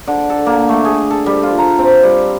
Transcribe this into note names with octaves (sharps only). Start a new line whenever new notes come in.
D3
A4
A#3
A3
G#4
A4
G3
F4
A#5
C4
G3